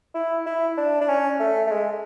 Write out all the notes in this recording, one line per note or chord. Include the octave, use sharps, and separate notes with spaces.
E4
E4
D4
D4
C#4
A3
A3
G#3